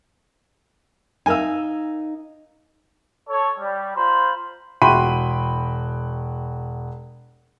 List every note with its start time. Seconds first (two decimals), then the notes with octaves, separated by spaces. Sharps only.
1.26 D#4 A#4 F5 G#5 E6
3.27 A4 C#5
3.58 G3
3.94 F4 C5 A#5 B5
4.82 E1 F#4 G5 B5 C6 D#7